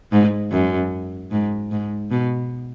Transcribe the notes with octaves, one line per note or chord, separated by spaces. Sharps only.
G#2
F#2
G#2
G#2
B2